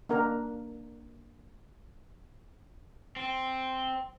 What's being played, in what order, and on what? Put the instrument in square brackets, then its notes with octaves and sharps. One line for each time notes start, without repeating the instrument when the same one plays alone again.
[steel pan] A#3 D4 A#4
[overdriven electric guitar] C4